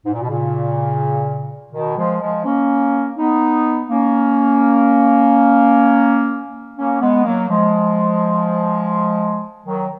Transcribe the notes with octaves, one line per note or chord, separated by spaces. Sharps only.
G#2
A#2
B2
A#2 C#3
B2 D#3
F3 G#3
F3 G#3
A#3 C#4
B3 D#4
A#3 C#4
A#3 C#4
G#3 B3
F#3 A#3
F3 G#3
D#3 F#3